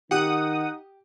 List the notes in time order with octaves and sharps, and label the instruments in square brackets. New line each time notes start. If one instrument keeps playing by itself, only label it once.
[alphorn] D#3 [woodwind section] D#4 [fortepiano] G4 [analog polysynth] F#5 D#6